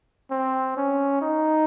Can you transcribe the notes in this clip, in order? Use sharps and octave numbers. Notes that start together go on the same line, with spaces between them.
C4
C#4
D#4